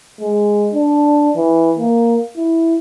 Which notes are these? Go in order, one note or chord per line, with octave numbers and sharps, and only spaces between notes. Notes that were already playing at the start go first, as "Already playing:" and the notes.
G#3
D4
E3
A#3
E4